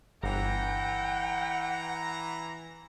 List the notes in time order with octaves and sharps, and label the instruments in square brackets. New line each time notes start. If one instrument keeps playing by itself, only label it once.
[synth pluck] G1 [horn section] E3 A#5 [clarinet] F#5 [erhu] G5